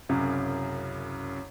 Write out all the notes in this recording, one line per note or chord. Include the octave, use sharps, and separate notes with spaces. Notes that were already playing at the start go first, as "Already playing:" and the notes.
C2 F#2 C#3